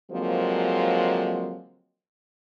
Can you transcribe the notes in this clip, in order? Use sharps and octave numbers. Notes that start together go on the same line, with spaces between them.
D3 F3 F#3 G#3 A#3 C4